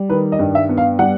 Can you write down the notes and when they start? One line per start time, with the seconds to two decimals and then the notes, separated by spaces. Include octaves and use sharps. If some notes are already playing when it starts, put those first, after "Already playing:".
Already playing: G3
0.09 D#3 B4
0.32 D#5
0.39 G2
0.55 E5
0.69 B3
0.78 F5
0.99 G3 F#5